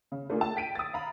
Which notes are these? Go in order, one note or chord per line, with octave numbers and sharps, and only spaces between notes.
C#3
A3 A#3 D4 F4 G#4
A5
G5 B6 D7 D#7
D#6 A6
F5 A#5 B5